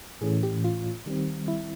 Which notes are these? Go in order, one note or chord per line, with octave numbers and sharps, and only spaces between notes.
A2 E3 A3 C#4 G#4
G4
F4
D#3 G3 C4
E4